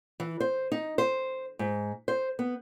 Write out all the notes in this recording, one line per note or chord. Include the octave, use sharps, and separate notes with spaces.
E3
C5
D#4
C5
G#2
C5
B3